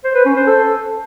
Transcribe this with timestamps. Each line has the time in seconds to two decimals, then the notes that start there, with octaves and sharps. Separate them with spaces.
0.04 C5
0.15 B4
0.25 C#4
0.36 C5
0.47 A4